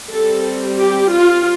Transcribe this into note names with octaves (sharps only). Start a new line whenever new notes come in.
G3 C4 A4
G4
F4